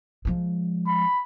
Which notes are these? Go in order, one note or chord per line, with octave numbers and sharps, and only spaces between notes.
F3 G#3
B5